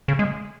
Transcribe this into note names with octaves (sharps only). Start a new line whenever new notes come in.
C#3
G#3